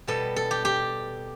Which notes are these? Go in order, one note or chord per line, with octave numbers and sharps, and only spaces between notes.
B2 G3 B3 A4
A4
G4
G4